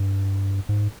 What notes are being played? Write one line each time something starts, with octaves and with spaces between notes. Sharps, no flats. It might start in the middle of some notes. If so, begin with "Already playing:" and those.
Already playing: G2
G#2